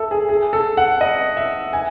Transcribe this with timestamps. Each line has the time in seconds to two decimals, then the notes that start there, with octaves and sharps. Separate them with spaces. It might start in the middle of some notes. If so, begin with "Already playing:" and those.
Already playing: A4 E5
0.11 G#4
0.29 G#4
0.53 A4
0.77 F#5
1.01 D#5
1.37 E5
1.73 G#5